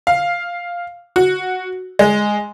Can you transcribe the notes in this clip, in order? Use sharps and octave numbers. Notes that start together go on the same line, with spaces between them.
F5
F#4
G#3